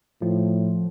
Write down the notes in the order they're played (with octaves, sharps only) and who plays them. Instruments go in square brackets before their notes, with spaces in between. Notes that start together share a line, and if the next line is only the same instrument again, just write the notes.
[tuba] A2 [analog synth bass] F3